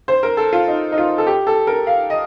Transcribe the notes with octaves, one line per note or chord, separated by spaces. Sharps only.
C5
A#4
A4
F4
D#4
D#4
F4
A4
G4
A4
A#4
F5
D#5